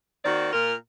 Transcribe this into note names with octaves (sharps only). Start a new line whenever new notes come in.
D#3 A#3 C4 F#4 D5
A#2 F4 A#4